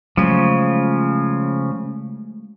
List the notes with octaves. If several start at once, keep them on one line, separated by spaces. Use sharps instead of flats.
C#3 F3 F#3 G#3 A3